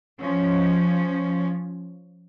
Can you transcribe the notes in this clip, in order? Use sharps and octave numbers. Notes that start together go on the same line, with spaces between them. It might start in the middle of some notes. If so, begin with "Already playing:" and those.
F3 C#4